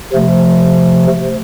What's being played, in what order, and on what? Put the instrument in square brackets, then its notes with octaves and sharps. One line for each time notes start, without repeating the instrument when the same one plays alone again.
[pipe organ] C3 F3 A3